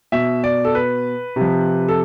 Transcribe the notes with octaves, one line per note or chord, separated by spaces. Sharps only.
B2 E5
D5
A4
B4
C3 F3
A4